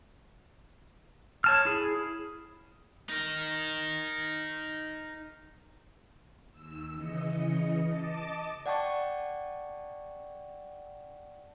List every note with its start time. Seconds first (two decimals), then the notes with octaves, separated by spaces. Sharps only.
1.44 C#5 A5 F6
1.65 E4 G#4
3.10 D#4 A#4
6.52 D#2 E6
6.92 C#3 E3 D#5 C#7
7.87 D#5 A5 D6
8.66 D5 F#5 G5 A5 C#6